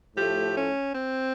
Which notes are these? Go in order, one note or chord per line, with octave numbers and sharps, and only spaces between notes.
A2 F3 A3 G4
C#4
C4